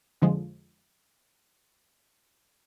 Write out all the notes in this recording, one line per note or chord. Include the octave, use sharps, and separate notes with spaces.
F2 D3 F3 G#3